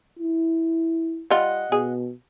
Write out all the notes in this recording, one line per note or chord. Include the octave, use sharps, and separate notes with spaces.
E4
G3 F4 D#5 F#5
B2 G#4